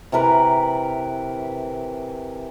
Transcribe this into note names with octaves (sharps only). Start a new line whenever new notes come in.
C3 E3 A#4 B4